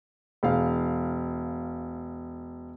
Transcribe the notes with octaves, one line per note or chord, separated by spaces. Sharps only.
E1 F5